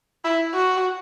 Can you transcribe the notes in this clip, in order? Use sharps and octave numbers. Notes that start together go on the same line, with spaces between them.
E4
F#4